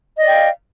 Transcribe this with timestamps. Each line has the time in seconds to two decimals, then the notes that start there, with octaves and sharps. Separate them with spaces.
0.16 D#5
0.21 D5
0.26 G5
0.30 F5